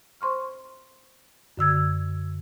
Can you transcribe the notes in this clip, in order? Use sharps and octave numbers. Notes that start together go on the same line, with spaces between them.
C5 C6 C#6 F6
F#2 D3 E6 G#6